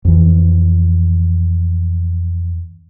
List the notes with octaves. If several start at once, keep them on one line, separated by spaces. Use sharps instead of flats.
F2 E3